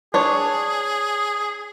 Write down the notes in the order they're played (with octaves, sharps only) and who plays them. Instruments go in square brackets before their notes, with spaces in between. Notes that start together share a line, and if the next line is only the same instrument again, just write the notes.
[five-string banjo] D4 C#5 [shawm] G#4